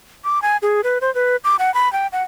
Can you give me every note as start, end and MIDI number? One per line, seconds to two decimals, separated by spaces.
0.24 0.42 86
0.42 0.57 80
0.62 0.81 68
0.84 0.98 71
1.01 1.13 72
1.15 1.36 71
1.44 1.56 86
1.59 1.73 78
1.74 1.91 83
1.93 2.07 79
2.13 2.22 78